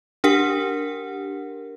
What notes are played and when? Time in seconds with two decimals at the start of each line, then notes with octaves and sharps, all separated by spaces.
0.24 D4 G4 A#4 F#5